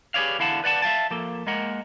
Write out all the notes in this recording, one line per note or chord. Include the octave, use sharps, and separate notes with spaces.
G4 G#4 B4 C#5 D5 F5
E2 D3 E4 F5 F#5 A5
B4 D5 F#5 A5
E5 F5 G5 A5
F3 A#3 A4
G#3 A#3 A#4 F#5